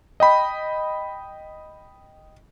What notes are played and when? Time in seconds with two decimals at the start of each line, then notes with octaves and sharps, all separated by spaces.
0.20 D#5 G5 B5